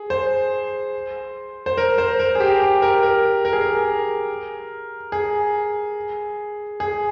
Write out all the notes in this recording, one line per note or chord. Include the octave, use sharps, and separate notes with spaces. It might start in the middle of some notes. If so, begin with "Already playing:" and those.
Already playing: G#4
C5
C5
A#4
C5
A#4
G#4
G4
G4
A#4
A#4
A#4
G#4
A#4
G#4
G#4